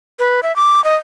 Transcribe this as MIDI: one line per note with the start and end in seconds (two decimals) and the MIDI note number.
0.19 0.41 71
0.43 0.54 76
0.56 0.83 86
0.84 0.95 75